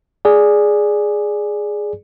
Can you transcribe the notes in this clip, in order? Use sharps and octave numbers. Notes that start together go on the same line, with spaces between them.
G#4 D5